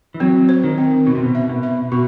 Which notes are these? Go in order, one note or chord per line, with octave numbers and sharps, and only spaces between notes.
E3
F#3 C4
C5
D#3
C4
B2 F#4
C3
B2
E5
B2
E5
B2 F#4